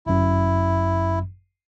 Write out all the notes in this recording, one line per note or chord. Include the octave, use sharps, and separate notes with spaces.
G1 F#2 E4